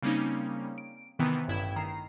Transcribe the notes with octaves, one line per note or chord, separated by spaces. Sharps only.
C#3 G3 A#3 C4 C#4 D#4
D7
C3 D#3 E3 B3
A1 G2 E4 G5 G#6 E7
D#3 A#5 C7